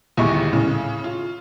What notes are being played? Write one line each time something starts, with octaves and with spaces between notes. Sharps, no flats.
G1 D#2 G#3 E4 G4 C#6
A2 C#3
F4